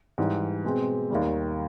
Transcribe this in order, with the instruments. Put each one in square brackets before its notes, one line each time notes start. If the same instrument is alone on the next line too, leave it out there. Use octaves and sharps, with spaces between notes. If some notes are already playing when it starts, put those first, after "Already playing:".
[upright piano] G#2 E3 G3
B2 G#3 C4
D#2 D#3 G3